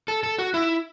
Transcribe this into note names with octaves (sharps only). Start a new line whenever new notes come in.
A4
A4
F#4
E4